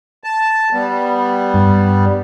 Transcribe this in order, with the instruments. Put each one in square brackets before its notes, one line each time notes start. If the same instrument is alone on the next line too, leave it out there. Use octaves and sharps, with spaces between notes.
[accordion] A5
G3 B3
[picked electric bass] G2